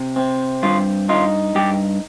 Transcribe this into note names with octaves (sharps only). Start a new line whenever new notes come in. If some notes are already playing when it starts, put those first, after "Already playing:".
Already playing: C3
C4
G2 F4
D#4 F4
G2 G4